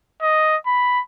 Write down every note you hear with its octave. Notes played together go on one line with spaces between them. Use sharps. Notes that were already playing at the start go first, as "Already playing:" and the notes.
D#5
B5